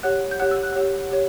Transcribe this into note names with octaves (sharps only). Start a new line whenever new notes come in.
G4 C#5 F#5 F#6
G6
G4 C#5 F#5 F#6
E6
F#6
G4 C#5 F#5
G4 C#5